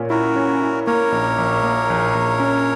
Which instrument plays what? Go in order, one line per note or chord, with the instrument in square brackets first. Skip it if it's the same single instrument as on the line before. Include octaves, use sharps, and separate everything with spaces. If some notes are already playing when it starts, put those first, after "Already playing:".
Already playing: [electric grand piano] A#2 C#4
[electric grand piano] E4 [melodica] F#4 A#4
[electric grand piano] C#4
E4
[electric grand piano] A#3 [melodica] A#4 C#5
[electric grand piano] A#1
A#1
A#3
A#1
A#1
C#4